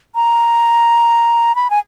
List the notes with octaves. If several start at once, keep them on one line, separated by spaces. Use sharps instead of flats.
A#5
B5
G#5